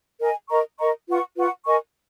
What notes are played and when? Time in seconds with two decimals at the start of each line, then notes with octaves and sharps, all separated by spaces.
0.19 A#4 D#5 G#5
0.48 A#4 D#5 A#5 C#6
0.78 A#4 D#5 A#5 C#6
1.07 F4 B4 F#5 C#6
1.36 F4 B4 F#5 C#6
1.66 A#4 D#5 G#5 C#6